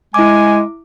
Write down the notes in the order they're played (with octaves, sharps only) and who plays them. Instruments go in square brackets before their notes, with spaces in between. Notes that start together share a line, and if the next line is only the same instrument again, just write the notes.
[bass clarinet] G#3 [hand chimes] E4 D6 [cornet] G#5